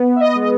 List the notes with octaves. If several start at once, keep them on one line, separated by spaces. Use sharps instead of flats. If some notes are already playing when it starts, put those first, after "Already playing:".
Already playing: B3
E5
D#5
G#3
D#5